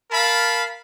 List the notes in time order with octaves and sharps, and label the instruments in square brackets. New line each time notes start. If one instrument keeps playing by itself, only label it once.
[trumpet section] A#4 F5 A5 B5